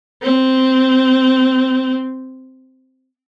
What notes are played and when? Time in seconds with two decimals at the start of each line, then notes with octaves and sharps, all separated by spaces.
0.23 C4